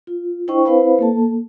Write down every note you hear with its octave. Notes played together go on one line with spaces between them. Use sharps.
F4
D4 E4 C5 D#5 G5 C#6
C4 E4 B4 C5 F5 B5
A#3 A4 A5